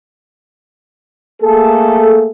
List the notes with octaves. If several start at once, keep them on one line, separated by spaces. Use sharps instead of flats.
A3 A#3 G#4 A4